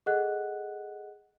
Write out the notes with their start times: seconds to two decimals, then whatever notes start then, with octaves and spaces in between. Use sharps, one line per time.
0.06 G#4 A4 D#5 F#5 F#6